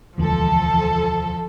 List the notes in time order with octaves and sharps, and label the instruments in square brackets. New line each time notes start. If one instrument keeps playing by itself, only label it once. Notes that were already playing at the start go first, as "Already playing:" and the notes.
[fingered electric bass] E1 D2 E3 [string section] F3 A4